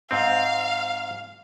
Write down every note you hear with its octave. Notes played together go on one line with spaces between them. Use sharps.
G#2 C4 F5